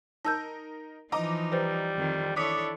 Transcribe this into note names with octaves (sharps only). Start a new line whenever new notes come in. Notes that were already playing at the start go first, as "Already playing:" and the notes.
D#4 A#4 A5 E6 G6
E3 F3 D#4 D#5 A#5 D6
G3 B4 C5
F2 D#3
D4 E4 A4 C#5 D6 D#6 B6